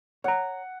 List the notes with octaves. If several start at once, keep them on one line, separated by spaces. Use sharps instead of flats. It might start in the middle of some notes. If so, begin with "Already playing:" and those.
C#5 F#5 A#5